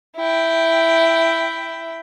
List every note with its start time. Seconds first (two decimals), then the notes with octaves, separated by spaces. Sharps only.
0.16 E4 G5